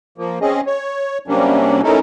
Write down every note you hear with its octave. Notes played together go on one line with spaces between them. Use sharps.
F3 A#3
C4 C#4 G#4 D#5
C#5
C3 F#3 G3 A#3 C#4 D4
A3 C#4 D#4 E4 A4 A#4